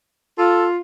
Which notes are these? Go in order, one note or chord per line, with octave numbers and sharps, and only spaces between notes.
F4 A4